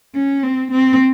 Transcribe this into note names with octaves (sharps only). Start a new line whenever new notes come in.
C#4
C4
C4